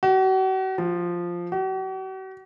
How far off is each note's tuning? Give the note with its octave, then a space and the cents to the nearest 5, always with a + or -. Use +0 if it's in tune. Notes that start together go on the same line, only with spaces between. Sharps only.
F#4 +40
F3 +0
F#4 +45